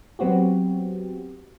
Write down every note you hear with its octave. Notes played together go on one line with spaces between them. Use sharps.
F#3 B3 C4 F#4 G4